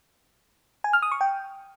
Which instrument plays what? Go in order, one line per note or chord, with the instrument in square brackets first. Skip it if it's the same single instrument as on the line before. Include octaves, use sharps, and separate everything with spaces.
[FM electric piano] G#5
F6
D#6
C#6
G5